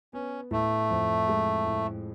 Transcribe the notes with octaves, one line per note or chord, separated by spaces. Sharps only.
B3 C#4
A2 A3
F2
G#3
A2